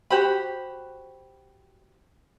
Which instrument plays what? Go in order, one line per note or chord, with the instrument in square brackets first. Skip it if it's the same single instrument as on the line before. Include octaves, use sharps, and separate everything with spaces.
[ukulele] F#4 G4 C5 B5